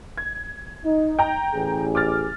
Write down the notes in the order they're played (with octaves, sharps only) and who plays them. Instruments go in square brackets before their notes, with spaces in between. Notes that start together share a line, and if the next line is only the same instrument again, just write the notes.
[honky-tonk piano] G#6
[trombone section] D#4
[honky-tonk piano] G5 A#5
[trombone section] A1 G#4
[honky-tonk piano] D6 F6 A6